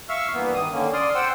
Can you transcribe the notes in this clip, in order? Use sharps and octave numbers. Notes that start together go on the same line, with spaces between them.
E5 F5 C#6 E6 F6
G2 E3 A#3 B3
D#3 D#6
D3 D#3 A#3 C#4
D5 C6 D#6 F6
C5 F#5 G5 C6 E6